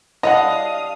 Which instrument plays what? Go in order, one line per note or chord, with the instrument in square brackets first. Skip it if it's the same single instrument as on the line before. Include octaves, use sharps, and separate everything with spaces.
[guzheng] G3 D4 [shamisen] E4 C#5 F#5 [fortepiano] D#5 [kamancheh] F5 D#6